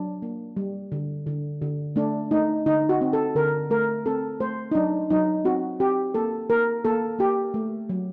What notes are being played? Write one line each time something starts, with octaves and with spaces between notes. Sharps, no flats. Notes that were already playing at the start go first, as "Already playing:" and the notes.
Already playing: F#3 D4
A#3
G3
D3
D3
D3
A3 D4
A3 D#4
D3 D#4
F#4
C4
A4
D3 A#4
A3 A#4
C4 A4
A3 C5
D#4
F#3 D4
F#3 D#4
C4 F#4
C4 G4
A#3 A4
A#3 A#4
A#3 A4
A#3 G4
A3
F#3